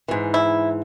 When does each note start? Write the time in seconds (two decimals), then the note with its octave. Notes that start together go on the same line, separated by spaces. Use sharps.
0.08 G#2 E3
0.34 E4